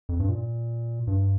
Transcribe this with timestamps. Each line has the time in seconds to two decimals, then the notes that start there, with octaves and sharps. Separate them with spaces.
0.09 F2
0.20 G2
0.29 A#2
1.07 G2